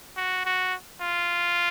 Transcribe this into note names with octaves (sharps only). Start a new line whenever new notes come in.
F#4
F#4
F4